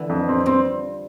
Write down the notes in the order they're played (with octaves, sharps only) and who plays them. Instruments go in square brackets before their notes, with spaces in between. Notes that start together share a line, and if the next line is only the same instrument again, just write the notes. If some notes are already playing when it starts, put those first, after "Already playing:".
Already playing: [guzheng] D3 E3
[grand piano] F2
C4
[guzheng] F3 G3 [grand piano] C4